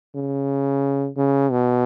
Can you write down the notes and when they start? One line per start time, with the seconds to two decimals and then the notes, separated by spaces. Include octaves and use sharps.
0.16 C#3
1.17 C#3
1.51 B2